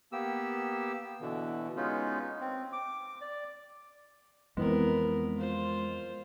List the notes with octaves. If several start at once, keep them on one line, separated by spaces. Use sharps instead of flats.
A#3 B3 G4 E6
B2 D3 E3
G#3 B3 C#4 D#4 F4
C4
D6
D5
F2 E3 G#3 B3 C4 A#4
F4 C5